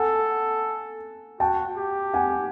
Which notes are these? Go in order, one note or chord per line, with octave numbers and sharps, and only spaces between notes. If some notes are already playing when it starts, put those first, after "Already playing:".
Already playing: A4 F#5 G#5
F#4 G5 A5
G4
F#5 G#5